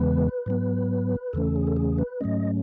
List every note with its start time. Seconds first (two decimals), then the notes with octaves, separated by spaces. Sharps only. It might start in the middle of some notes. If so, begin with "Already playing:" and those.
Already playing: E2 C#3 E3 G#3 B3 B4
0.46 G#2 F#3 B3
1.33 E2 C#3 E3 A3 C#4 A4
1.56 G#4
1.67 A4
1.77 G#4
1.98 B4
2.21 G#2 F#3 A3 C#4 D#5